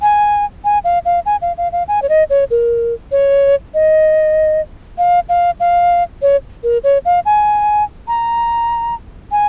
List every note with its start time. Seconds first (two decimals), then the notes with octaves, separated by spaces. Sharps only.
0.02 G#5
0.64 G#5
0.84 F5
1.05 F5
1.26 G#5
1.42 F5
1.58 F5
1.72 F5
1.88 G#5
2.02 C#5
2.09 D#5
2.30 C#5
2.51 A#4
3.12 C#5
3.74 D#5
4.98 F5
5.29 F5
5.60 F5
6.22 C#5
6.63 A#4
6.84 C#5
7.05 F5
7.26 G#5
8.08 A#5
9.32 G#5